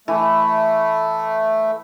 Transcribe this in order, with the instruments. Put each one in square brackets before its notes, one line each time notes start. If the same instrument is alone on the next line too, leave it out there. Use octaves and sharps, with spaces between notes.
[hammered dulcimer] E3 [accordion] A3